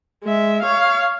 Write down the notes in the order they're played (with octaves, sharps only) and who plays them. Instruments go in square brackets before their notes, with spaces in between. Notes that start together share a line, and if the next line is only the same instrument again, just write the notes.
[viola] G#3 E5
C#5 F5